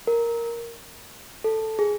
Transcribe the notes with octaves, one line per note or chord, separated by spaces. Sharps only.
A#4
A4
G#4